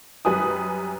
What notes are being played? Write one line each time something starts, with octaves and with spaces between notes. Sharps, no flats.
F#2 G3 B4 G#5 D#6